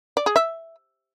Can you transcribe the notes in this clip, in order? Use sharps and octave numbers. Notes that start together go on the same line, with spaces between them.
D5
G#4
E5